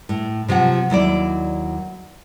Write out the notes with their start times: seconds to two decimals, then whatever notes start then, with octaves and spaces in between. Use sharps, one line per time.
0.09 A2
0.48 C3 F3 F#3 F#5
0.90 D#2 F#3 E4 D5